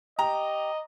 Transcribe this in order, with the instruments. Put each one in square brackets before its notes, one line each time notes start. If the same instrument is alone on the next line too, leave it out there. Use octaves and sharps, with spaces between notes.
[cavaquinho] G4 [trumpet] D#5 [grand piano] A#5